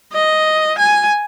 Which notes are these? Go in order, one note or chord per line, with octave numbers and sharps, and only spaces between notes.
D#5
G#5